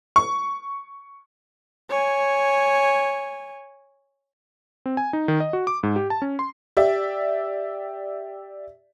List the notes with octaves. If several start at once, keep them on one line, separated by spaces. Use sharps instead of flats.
C#6
C#5 G#5
C4
G#5
D#4
D#3
D#5
F#4
D6
G#2
G4
A5
C#4
C6
G4 D5 E5